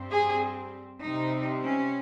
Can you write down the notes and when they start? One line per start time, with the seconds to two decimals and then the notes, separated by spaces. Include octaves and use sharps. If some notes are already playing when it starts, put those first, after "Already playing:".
Already playing: G2 G3 C4
0.11 G#4
1.03 C3 G3 C4 D#4
1.64 C#4